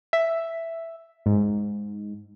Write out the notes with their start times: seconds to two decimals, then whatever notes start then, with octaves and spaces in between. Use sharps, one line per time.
0.13 E5
1.26 G#2